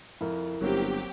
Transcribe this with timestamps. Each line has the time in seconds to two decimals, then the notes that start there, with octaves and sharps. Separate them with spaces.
0.21 F2 E4 A#4
0.61 G1 F#3 A#3 C4 G4